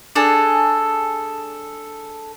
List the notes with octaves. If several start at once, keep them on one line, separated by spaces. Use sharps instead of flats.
D4 G#4 A4